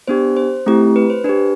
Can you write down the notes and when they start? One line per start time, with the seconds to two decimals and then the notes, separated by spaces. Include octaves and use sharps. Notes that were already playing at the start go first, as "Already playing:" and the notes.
0.08 B3 D4 G4 C5
0.37 C5
0.66 A3 C4 E4 G4
0.96 B4
1.10 C5
1.24 D4 G4 B4